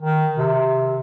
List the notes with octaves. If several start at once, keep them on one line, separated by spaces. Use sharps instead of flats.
D#3
C3